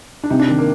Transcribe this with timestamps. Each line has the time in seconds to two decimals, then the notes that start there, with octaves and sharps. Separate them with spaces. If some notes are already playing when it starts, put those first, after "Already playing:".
0.24 D4
0.30 C3 D#4
0.39 D4
0.49 D#3
0.58 A#3